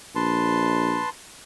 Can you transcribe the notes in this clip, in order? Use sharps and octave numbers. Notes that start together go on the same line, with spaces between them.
A#1 B4 A5 C6